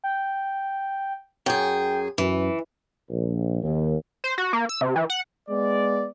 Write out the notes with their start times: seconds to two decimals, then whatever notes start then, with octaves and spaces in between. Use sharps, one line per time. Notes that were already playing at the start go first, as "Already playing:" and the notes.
0.04 G5
1.46 F#2 G#4 G5
2.18 F#2 E3
3.10 A#1
3.63 D#2
4.24 C5
4.38 F#4
4.53 A#3
4.69 E6
4.81 C3
4.96 E3
5.10 F#5
5.49 G#3 B3 D5